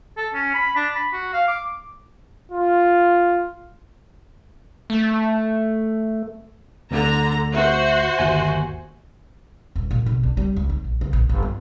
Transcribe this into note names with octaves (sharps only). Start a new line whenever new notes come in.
A4
C#4
B5
D4
B5
F#4
F5
D6
F4
A3
D2 D3 A#5
F#4 C5 E5
G1 D#2 G#5
D#1
A#2
B1
D4
G3
C#2
D#4
A#1
C#2
A#1
G1
F4